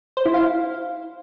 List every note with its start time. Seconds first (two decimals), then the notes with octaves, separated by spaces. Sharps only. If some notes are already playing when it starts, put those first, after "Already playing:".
0.17 C5
0.25 E4
0.34 F5